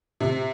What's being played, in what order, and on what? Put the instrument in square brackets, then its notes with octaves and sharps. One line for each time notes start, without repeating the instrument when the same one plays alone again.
[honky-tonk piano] C3